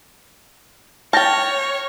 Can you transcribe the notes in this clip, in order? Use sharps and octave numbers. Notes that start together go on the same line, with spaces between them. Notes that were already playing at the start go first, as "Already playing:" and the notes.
C#5 G5 A5 F6 G6 A#6